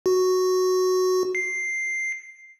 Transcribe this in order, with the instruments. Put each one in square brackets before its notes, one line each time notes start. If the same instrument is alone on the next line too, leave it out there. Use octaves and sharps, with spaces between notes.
[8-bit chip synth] F#4
C7